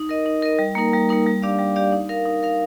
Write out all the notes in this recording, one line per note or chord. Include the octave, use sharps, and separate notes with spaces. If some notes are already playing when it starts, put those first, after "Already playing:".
Already playing: D#4
A#4 D#5
D#4
A#4 D#5
G3
A#3 D#4 A#4
G3
A#3 D#4 A#4
G3
D4 G4 D5 F5
G3
D4 G4 D5 F5
D#4
A#4 F5
D#4
A#4 F5